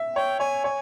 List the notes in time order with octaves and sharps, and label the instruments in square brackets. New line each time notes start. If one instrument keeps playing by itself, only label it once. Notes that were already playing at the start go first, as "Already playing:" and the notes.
Already playing: [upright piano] E5
[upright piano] C#5 [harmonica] G5
[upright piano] C#5 [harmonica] G#5
[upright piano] C#5 [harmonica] G#5